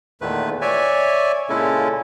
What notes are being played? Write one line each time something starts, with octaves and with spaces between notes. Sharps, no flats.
E2 A#2 D#3 A3 B4
C#5 D5 E5 G#5
A#2 C#3 G#3 C#4 E4 A4